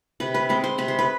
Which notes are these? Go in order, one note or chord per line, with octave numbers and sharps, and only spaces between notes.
C3 B4
B4
G#3 C4 B4
C5
C3 B4
C5
B4